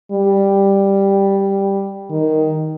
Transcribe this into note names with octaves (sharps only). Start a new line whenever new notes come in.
G3
D#3